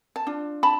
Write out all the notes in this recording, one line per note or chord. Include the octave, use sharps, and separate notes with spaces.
A5
D4 F4
A5 B5